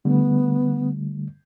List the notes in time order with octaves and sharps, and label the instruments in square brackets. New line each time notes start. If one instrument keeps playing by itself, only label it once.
[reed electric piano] D3 G3 A3 [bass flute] B3